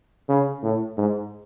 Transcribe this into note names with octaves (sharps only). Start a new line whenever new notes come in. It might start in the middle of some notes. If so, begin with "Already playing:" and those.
C#3
A2
G#2